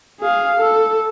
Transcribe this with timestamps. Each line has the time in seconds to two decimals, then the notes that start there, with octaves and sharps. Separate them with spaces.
0.21 G#4 F5
0.59 A4